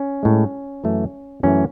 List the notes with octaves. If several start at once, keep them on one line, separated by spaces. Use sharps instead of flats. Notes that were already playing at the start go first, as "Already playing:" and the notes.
Already playing: C#4
A2 G#3
F#2 E3 A3
F#2 E3 A3 C#4